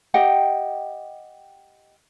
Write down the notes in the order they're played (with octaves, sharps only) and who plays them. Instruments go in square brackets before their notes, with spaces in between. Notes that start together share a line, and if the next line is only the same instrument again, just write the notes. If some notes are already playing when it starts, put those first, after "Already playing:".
[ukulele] G4 D#5 F#5 G5